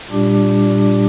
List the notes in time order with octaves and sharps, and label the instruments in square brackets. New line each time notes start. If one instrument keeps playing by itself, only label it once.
[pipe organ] A#2 G3 D4 G4